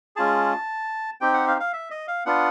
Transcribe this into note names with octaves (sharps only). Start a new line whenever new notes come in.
G#3 C#4 F4 G#4 A5
C4 D#4 G4 G5
F#5
F5
F5
E5
D#5
F5
B3 D4 F4 F#5